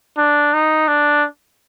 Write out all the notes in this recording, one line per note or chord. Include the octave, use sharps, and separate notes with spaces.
D4
D#4
D4